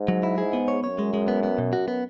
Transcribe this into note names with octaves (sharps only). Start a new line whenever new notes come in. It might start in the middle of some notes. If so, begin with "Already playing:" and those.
Already playing: G#2
F#3
E4
G#2 G#4
B3
C#5
F#2 C#5
G#3
G#3
B3
B3
B2
F#4
B3